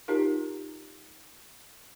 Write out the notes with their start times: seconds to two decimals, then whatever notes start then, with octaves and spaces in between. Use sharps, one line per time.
0.08 D#4 F4 G4 A#4